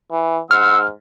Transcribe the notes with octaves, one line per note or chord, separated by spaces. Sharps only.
E3
G#2 F#5 C6 E6 F6